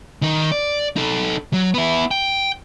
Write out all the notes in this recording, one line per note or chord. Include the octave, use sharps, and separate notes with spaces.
D#3 D#4
D5
D#4 A4
F#3
B3 E4
G5